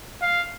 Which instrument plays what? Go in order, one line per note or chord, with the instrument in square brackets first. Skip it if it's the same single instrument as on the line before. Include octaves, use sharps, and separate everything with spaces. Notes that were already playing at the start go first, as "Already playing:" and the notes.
[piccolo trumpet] F5